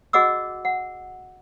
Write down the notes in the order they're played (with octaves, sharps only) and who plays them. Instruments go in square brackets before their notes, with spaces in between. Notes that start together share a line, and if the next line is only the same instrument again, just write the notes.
[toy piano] F#4 G#4 D#5 F#5 D6 E6
F#5